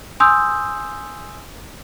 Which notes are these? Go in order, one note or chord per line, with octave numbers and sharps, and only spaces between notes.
G#5 C6 D#6 E6 G6